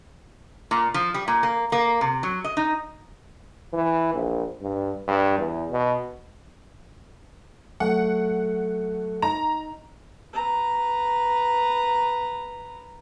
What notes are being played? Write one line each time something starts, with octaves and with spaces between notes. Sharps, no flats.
A#2
F3
G3
A#2
A#3
A#3
C3
F#3
D#5
D#4
E3
A#1
G2
G2
E2
B2
F#3 A3 F#5
D#4 A#5
B4 A#5